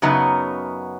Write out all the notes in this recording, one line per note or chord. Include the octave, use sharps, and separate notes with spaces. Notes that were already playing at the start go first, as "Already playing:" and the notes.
F#2 C#3 F#3 B3 D#4